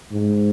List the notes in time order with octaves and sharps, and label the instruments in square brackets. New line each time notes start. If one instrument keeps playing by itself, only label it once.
[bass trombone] G#2